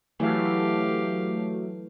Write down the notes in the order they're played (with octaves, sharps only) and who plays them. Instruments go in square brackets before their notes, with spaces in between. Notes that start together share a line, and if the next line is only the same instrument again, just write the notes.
[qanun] E3 [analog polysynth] F#3 A3 [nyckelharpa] G4 F5